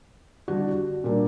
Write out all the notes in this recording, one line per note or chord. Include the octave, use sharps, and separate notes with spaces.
D3 G3 D4 F#4
A#2 G3 D4